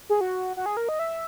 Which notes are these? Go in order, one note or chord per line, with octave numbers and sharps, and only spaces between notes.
G#4
F#4
F#4
G#4
A#4
D#5
E5